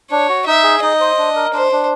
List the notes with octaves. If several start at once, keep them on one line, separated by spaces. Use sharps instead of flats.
D4 C#5
F#4
D#4 E5
G#4
D#4 D#5
C5
D4
A#4
D4 C5
D4